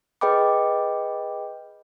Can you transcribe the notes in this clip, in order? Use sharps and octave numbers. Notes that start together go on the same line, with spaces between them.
G#4 B4 D#5 G5 B5 D6